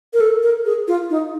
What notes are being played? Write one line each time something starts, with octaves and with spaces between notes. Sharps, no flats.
A#4
A4
A#4
G#4
F4
D#4